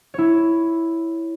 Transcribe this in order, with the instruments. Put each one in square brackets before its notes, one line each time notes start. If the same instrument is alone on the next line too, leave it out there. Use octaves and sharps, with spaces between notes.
[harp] E4 C#5